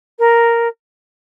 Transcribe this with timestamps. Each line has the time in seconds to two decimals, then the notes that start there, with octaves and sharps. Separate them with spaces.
0.19 A#4